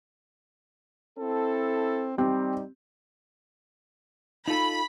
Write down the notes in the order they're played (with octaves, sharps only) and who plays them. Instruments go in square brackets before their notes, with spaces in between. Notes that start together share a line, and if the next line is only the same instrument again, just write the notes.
[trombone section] C4 E4 A4
[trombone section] G3 D#4 [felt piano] C4 G4
[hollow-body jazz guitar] D#4 F4 A4 [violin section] B5